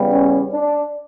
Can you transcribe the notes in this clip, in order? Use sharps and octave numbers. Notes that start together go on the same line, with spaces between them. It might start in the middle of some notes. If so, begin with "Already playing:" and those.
Already playing: E2 C#3 G3 B3
C#4
D4